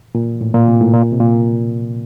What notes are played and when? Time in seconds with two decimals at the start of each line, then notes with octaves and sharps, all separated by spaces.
0.15 A#2
0.41 A2
0.54 A#2
0.68 C3
0.81 A2
0.94 A#2
1.12 C3
1.20 A#2